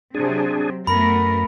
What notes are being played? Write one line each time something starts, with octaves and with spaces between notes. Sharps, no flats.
C3 F#3 C4 D4 G#4
F#2 A3 B3 A#4 B5